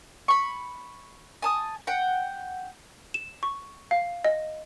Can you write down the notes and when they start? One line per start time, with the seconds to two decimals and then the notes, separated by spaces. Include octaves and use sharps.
0.28 B5 C#6
1.42 G#5 A5 D#6
1.87 F#5 G5
3.14 E7
3.43 C#6
3.91 F5
4.25 D#5